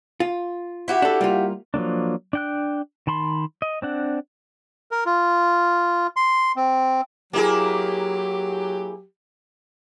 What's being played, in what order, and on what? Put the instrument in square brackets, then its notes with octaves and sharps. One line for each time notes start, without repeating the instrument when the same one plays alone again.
[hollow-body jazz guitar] F4
[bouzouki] E4 F#4 G4
[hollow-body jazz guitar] D4 A4
G3 A#3 F4
[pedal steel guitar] F3 F#3 A#3 D4
D4 G5 F#6
D#3 A5 B5 C6
D#5
C4 D4 F#5
[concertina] A#4
F4
C6
C4
[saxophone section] F#3 G4 [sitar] A#3 E4 G#4